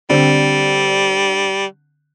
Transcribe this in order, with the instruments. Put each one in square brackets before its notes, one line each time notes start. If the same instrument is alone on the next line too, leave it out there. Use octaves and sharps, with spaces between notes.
[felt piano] D3 C4 [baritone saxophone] G3